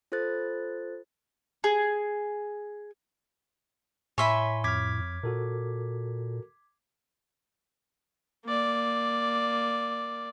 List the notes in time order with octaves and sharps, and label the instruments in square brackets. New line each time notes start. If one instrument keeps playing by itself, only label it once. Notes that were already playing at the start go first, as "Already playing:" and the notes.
[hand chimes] F4 A4 C5 F#6 A6
[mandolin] G#4
[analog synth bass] A2 [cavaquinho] C#5 E5 B5 [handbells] G#5 C6
[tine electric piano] F2 F6 [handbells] D6 G#6 B6
[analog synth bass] A#2 [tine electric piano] F#4 A4 A#4
[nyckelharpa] A#3 D5